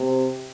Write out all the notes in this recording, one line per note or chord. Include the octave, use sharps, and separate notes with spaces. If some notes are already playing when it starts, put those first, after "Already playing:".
Already playing: C3